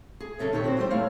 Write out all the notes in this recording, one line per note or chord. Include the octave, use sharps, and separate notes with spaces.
G#4
F#2 C#3 F#3 A4 C#5 E5
A#2 D#3 D#4 G4 B4 C#5
C4 F#4 G4 C5
E3 G3 G4 A4 C5
A3 E4 C#5 F5